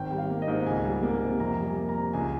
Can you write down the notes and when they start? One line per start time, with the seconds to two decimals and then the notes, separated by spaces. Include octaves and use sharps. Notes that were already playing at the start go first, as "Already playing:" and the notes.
Already playing: G#1 G5
0.11 G3
0.18 F5
0.30 A#3
0.42 D#5
0.48 G#2
0.66 C#2 G#5
0.85 G3
1.03 A#3
1.22 C3
1.39 F2 A#5
1.59 G3
1.65 G#5
1.76 A#3
1.89 A#5
1.95 C3
2.13 C#2 G#5